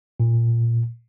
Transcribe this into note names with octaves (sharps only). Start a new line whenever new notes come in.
A#2